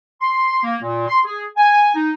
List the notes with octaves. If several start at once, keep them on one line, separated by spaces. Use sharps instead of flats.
C6
A#3
A#2
C6
G#4
G#5
D#4